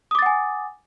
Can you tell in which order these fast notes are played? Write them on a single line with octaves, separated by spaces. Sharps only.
D#6 D6 A6 F#5 G#5